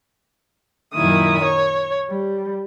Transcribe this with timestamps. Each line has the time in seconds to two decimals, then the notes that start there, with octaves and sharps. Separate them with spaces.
0.94 F#2 A#2 D#3 E4 D#6
1.43 C#5
2.09 G3